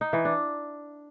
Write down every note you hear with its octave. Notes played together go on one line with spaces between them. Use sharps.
D#4
E3
D4